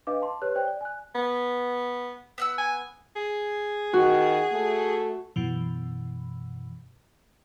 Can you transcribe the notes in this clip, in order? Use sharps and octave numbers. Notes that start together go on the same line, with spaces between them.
D4 B4 D#5 F5 D6
A5 C6
G4 B4 C#5 F#6
C5 D5 G5 F#6
D5
G#5 F#6
B3
B3 F#5 E6
G#5
G#4
D#3 F#4
A3
F#2 B2 E3